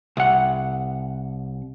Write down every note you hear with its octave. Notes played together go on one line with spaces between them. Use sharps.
C2 F#5